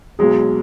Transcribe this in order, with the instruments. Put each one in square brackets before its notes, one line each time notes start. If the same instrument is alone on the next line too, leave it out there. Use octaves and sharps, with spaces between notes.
[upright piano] B1 B2 F#3 G#3 G#4